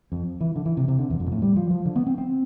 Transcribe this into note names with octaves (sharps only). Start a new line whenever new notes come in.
F2
E3
D3
E3
C3
C3
D3
E2
F2
B2
A2
G3
F3
F3
D3
B3
C4
C4